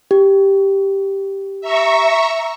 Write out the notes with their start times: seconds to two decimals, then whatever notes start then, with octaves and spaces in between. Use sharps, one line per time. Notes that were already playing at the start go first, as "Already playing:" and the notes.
0.11 G4
1.61 E5 A#5 C#6